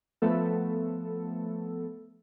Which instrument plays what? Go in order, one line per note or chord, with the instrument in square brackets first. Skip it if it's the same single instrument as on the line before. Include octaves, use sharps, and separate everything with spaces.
[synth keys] F3 A3 B3 A4